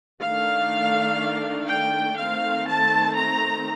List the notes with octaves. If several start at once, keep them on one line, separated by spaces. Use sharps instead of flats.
D#3 A3 D4 F5
G5
D#3 A3 C4 F5
A5
A#5